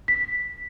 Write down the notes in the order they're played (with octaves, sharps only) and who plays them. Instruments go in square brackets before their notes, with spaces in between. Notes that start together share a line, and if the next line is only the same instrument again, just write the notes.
[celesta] B6